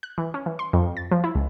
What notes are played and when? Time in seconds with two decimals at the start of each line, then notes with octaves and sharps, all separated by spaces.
0.03 F#6
0.18 E3
0.34 C#4
0.46 E3
0.59 C6
0.73 F2
0.97 A6
1.11 F3
1.24 E4
1.35 C#2